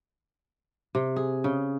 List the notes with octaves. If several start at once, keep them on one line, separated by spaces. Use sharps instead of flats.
C3
G#4
C#3